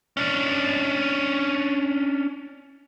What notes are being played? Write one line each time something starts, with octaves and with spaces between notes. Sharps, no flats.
C#4 D4